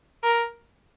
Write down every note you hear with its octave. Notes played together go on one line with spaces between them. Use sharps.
A#4